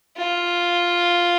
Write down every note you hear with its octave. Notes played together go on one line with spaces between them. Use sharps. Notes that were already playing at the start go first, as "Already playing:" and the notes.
F4